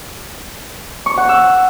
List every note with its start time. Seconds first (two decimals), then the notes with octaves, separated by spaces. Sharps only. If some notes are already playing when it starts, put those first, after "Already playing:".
1.06 C#6
1.18 F#5
1.29 E6